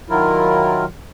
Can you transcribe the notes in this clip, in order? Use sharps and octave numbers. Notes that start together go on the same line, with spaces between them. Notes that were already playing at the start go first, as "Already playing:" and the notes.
D#3 F#3 E4 F4 A#4